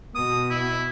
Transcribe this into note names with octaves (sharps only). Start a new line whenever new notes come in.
B2 D#6
E4